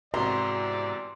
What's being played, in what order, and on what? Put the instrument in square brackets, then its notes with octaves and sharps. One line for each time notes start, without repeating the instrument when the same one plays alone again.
[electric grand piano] E2 C3 [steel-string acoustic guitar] G#2 F#4 A#4 [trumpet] D5 [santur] C6